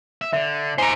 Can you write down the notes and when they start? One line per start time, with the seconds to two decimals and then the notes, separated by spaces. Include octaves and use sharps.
0.21 E5
0.33 D3 E5
0.78 D#4 G4 C5 G#5 A#5